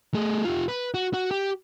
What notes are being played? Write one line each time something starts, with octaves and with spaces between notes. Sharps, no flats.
A3 G#4
F4 G4
B4
F#4
F#4
G4